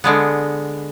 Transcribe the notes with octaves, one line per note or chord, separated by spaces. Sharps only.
D3 G#3 B3